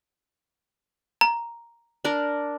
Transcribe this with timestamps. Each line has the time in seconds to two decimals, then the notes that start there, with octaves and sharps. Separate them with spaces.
1.21 A#5
2.05 D4 A#4